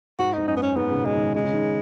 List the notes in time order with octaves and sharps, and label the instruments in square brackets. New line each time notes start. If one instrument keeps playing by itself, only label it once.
[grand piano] G#2 [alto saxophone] F#4
[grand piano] G#2 [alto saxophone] D#4
[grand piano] F#2 [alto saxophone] D#4
[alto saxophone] B3
C#4
[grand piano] G#2 [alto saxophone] B3
[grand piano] C#3
B2
[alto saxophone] G#3
[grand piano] D#3
[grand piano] C#3 [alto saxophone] G#3
[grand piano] C#3
D#3